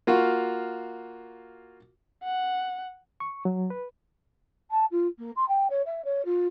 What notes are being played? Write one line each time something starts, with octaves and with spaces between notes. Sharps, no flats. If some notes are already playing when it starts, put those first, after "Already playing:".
A#3 F4 F#4
F#5
C#6
F#3
B4
A5
F4
A#3
C6
G5
C#5
E5
C#5
F4